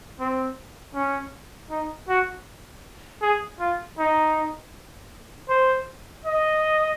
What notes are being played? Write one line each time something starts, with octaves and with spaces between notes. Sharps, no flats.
C4
C#4
D#4
F#4
G#4
F4
D#4
C5
D#5